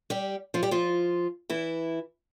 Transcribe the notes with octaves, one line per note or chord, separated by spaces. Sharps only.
G3 G4
F3 F4
G3 G4
F3 F4
E3 E4